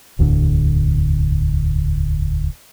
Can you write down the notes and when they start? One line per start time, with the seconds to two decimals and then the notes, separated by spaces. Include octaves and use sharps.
0.19 E1 D2 A2 D3